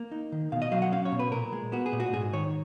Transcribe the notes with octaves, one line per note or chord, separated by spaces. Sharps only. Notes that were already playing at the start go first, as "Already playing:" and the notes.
Already playing: A#3
D#4
D#3
B2 F5
D#5
F#3 F5
F#5
C#4 F5
C#5
B2
B4
A#2 A#4
G#3
B3 F#4
G#4
A#2
F#4
G#2 G#4
D#3 C#5